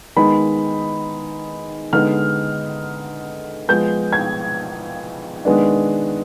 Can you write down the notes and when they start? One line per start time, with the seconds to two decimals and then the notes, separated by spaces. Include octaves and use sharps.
0.16 D#3 G#3 B3 D#4 B5
1.93 D3 G#3 B3 D#4 F6
3.69 F3 G#3 B3 G6
4.13 G#6
5.45 D#3 G#3 B3 D4